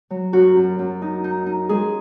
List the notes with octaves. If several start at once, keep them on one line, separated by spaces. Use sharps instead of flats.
F#3
F#2 F#4
F#2
F#2
D#4
D#4
D#4
G#3 G#4